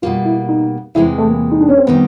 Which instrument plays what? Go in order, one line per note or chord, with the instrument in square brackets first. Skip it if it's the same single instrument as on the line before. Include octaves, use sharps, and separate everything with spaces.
[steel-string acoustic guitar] B2 G3 A#3 [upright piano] F4
[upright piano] E4
D#4
[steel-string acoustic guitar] E2 C3 E3 G#3 [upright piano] E4
[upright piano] A3
A#3
D#4
D4
C#4
C4
[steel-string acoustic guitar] C3 D#3 G3 [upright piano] B3